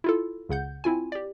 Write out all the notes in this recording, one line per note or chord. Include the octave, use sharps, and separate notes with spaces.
E4 F4 A4
C#2 C#3 F#5 G6
C4 E4 F4 G#5
G4 D5